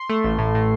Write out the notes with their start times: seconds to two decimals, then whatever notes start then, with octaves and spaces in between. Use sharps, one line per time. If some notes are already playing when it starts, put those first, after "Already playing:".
Already playing: C6
0.10 A3
0.24 A1
0.39 A2
0.55 A2